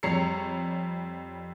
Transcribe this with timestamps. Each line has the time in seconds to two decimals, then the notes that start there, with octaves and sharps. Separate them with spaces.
0.03 F2 G3 C#5 A#5 C7 C#7